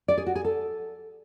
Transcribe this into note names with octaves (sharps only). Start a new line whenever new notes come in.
D5
G#4
F#4
G#4
A4